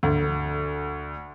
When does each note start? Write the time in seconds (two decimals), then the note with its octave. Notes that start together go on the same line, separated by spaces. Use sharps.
0.03 D2